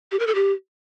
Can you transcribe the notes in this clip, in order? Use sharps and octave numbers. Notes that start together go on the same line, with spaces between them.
G4
A#4
A4
G4